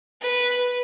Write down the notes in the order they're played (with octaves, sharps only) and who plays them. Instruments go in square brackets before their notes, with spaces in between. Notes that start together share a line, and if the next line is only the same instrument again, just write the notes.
[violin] B4